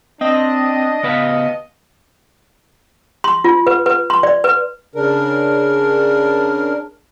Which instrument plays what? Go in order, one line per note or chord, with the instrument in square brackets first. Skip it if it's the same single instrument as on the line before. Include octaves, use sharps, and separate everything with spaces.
[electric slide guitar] C4 [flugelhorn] D4 [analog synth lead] D#5
[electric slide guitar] C#3 B3 B4 [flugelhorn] F5
[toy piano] C6
F4
B4
B4
C6
D5
B4
[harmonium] C#3 D4 A#4